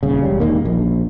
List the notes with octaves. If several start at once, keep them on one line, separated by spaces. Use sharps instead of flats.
D#1 C#3
E1 G3
E1 D#3 A#3
A#1